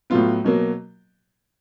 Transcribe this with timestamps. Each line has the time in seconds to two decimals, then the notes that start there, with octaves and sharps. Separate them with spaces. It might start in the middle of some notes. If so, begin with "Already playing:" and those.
0.10 A2 F#3 B3 F4
0.44 B2 F#3 A#3